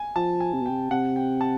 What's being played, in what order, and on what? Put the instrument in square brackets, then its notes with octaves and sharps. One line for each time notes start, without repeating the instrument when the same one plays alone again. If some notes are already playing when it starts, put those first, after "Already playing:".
Already playing: [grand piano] G#5
[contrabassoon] F3 [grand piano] A5
[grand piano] G#5
[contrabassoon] C3
B2
[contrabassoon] C3 [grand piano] G5
[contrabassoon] C3 [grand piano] F#5
[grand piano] G5
A5